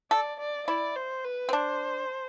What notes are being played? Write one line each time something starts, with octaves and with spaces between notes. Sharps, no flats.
A4 D5
D5
E4 D5
C5
B4
C4
D4 C5